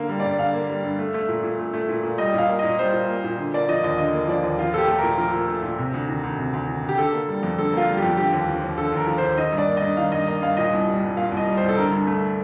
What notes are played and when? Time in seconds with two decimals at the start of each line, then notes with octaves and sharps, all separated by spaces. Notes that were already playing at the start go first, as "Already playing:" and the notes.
Already playing: D3 A#3 F5
0.09 G3
0.20 D5
0.25 G2
0.39 D3 F5
0.54 A#3
0.69 G3
0.84 G2
0.99 A3
1.14 A3
1.29 A#2
1.43 A#2
1.59 A3
1.74 A3
1.88 A#2
2.03 A#2
2.18 G3 D#5
2.34 A#2 F5
2.49 A#3
2.59 A#2 D#5
2.79 G3 C5
2.93 A#2
3.09 A#3
3.24 A#2
3.39 D3
3.54 A#3 D5
3.69 F3 D#5
3.83 D#2 D#5
3.98 D3 D#5
4.13 A#3
4.28 F3 D5
4.44 D#2
4.58 F3 F4
4.74 A#2 G4 A4
4.88 A3
4.99 A#2 A#4
5.18 F3 A#4
5.33 A#2
5.48 A3
5.63 A#2
5.78 C3
5.94 D2
6.09 D#3
6.23 D2
6.38 C3
6.53 D2
6.69 D#3
6.83 D2
6.89 G4
6.98 D3 A4
7.13 A#3
7.29 G3
7.43 F2
7.58 D3 A4
7.73 A#3 F4
7.88 G3
7.98 F2 G4
8.17 D3 G4
8.33 D#2
8.48 F3
8.62 D#2
8.77 D3 A4
8.93 D#2 A#4
9.07 F3
9.18 D#2 C5
9.38 D#3 D#5
9.52 G2
9.58 D5
9.68 A#3
9.77 G2 D#5
9.97 D#3 F5
10.12 G2 D#5
10.27 A#3 D#5
10.42 G2 F5
10.57 A#2 D#5
10.73 C2
10.88 G3
11.03 C2
11.17 A#2 F5
11.32 C2
11.37 D#5
11.47 G3
11.57 C5
11.63 C2
11.68 A4
11.77 D3 A#4
11.92 G2
12.07 A3